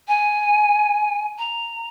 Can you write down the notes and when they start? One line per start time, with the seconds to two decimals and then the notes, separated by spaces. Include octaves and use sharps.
0.08 G#5
1.38 A#5